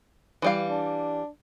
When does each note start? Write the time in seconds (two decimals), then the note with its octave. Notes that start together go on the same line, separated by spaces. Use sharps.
0.42 E3 G3 F5
0.70 D4